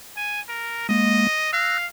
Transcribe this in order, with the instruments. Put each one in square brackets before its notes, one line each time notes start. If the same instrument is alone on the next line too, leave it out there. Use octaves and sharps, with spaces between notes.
[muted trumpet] G#5
A#4
[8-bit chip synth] G#3 A#3 [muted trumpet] D#5
[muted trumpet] F5 [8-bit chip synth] E6 F#6 A#6